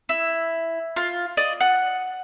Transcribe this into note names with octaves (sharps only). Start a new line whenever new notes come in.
E4
F4
D5 D#5
F#5